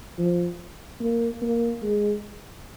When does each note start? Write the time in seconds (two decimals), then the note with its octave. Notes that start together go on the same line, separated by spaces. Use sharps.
0.18 F3
1.01 A#3
1.42 A#3
1.83 G#3